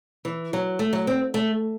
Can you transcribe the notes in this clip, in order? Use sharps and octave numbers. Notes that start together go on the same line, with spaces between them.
E3
F#3
A3
F#3
C4
A3